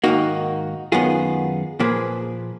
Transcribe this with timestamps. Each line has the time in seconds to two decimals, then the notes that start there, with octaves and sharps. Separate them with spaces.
0.04 G#2 D#3 A#3 D#4 F#4
0.92 F#2 D#3 G#3 B3 F4 G#4
1.80 A#2 F3 A#3 G#4 B4